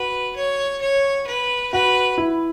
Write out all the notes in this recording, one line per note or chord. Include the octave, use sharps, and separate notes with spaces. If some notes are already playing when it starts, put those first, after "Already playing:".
Already playing: F#4 B4
C#5
C#5
B4
F#4 B4
E4